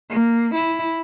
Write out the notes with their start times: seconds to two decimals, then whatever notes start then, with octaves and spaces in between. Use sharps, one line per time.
0.10 A#3
0.55 E4